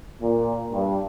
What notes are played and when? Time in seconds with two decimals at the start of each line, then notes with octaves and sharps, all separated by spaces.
0.22 A#2
0.72 G2